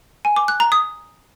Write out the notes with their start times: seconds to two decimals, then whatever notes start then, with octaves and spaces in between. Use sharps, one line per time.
0.25 G#5
0.36 D6
0.48 F#6
0.60 A#5
0.72 D#6